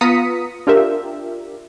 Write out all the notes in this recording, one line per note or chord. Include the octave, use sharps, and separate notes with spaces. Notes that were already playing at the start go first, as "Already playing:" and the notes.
B3 F4 A#5 D#6 B6 C#7
D4 F4 G4 A#4 E5